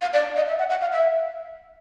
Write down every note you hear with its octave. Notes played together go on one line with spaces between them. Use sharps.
F5
D5
D#5
E5
F#5
F#5
F5
E5